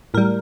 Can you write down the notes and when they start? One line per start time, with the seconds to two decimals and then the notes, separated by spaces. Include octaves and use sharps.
0.14 A2 G3 A#4